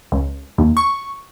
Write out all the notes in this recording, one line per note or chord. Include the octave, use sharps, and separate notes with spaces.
C#2
D#2
C#6